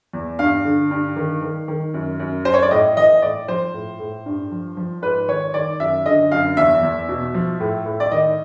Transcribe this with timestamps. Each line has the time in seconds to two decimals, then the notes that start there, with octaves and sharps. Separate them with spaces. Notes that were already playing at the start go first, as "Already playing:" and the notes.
0.13 E2
0.39 G2 F5
0.65 D3
0.91 G2
1.16 D#3
1.42 D#3
1.68 D#3
1.94 F#2
2.19 F#2
2.45 F#2 C5
2.54 C#5
2.62 D5
2.71 A2 D#5
2.97 E3 D#5
3.22 A2 D5
3.48 F3 C5
3.74 A2
3.99 A2
4.26 G2
4.51 F3
4.77 F3
5.02 G#2 B4
5.28 D#3 C#5
5.54 D#3 D5
5.80 F#2 E5
6.06 D3 D#5
6.31 F#2 F5
6.57 E2 E5
6.83 E2
7.09 B2
7.34 F3
7.60 A2
7.86 A2
8.00 D5
8.11 D#3 D#5